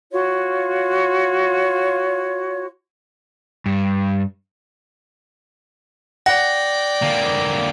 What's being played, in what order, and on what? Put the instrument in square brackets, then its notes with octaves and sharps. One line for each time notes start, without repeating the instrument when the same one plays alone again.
[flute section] F4 F#4 C#5
[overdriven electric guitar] G2
[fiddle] D5 G5 [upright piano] F#5 [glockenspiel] A#6
[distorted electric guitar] D3 A#3